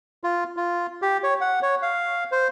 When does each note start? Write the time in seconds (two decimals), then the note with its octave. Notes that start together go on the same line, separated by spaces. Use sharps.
0.24 F4
0.57 F4
1.02 G4
1.24 C#5
1.41 F#5
1.62 C#5
1.82 F5
2.32 C5